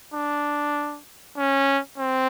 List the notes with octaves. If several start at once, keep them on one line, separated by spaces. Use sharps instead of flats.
D4
C#4
C4